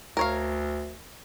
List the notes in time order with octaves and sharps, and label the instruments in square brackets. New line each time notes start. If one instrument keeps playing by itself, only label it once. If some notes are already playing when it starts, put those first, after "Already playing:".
[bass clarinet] D2 [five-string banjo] A#4 C#5 F5